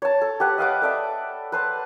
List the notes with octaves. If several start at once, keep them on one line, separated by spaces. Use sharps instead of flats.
C#5 A5
A4
G4 B4 F#5
D#5 F5 F#5 D6
A4 D5 E5
B4 C5 A5